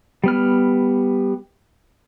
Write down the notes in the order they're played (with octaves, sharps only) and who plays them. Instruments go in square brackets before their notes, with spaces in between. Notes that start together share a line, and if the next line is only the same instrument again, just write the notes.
[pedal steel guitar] G3 B3 F6